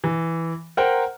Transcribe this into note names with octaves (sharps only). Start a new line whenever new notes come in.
E3
A#4 C5 F#5 G5 A#5